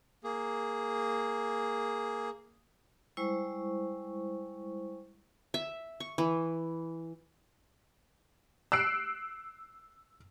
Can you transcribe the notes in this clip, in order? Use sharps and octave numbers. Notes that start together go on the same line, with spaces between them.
A#3 G#4
G3 G#3 E4 C5 C#6
E5
C#6
E3
E6 F#6 C7 D7